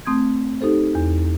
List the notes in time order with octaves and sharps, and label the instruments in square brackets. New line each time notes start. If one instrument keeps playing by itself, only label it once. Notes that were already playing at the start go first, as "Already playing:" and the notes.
[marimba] A3 C4 D#6 G6 G#6
D#4 G4 A4 C5
E2